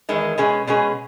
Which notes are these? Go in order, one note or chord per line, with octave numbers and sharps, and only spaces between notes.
E2 D#3 G#3
B2 G#3 C#4 G#4
B2 G#3 C#4 G#4